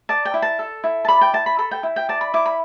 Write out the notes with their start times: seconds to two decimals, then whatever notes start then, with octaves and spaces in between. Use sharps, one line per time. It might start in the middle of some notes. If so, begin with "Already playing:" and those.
0.09 D5 A5
0.25 G5
0.34 E4
0.42 A5
0.59 A4
0.84 E4
1.05 A5
1.08 D5 B5
1.21 G5
1.33 E4 A5
1.46 B5
1.59 A4 B5
1.71 G5
1.83 E4
1.96 G5
2.09 D5 A5
2.21 B5
2.34 E4 D6
2.46 B5